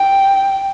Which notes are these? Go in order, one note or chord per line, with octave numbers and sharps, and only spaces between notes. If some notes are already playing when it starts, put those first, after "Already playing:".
Already playing: G5